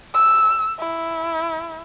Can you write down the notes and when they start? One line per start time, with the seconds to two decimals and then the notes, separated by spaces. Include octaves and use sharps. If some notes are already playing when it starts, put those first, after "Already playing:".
0.14 E6
0.79 E4